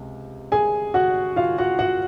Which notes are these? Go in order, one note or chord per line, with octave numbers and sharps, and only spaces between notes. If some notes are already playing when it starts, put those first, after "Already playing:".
Already playing: C#2 C3
G#4 G#5
F#4 F#5
F4 F5
F#4 F#5
F#4 F#5